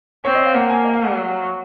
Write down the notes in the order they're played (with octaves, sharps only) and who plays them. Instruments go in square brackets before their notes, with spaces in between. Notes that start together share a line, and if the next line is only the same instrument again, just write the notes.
[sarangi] C4 [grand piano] C#5
[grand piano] D#5
F5
[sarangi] A#3 [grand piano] F#5
[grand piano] G#5
D#5
F5
F#5
[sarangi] F#3
[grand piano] C#6